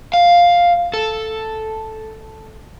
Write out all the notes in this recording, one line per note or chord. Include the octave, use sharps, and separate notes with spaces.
F5
A4